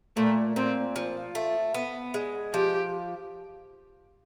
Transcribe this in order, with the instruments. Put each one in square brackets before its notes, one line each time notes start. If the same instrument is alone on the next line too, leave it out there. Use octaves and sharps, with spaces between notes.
[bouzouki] A#2 [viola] A3
[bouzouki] A#2 [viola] C4
[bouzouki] F3
A3
B3
G#3
[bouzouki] F3 [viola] G4